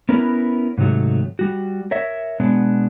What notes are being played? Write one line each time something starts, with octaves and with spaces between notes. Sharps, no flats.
B3 C#4 E4 A#4 B4
G#2 C3 D#3 F#3 A3
G3 F#4
A#4 C#5 E5
B2 G#3 B3 D4